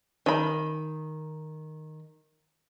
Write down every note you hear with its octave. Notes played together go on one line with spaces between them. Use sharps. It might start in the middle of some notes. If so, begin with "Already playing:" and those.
D#3 B5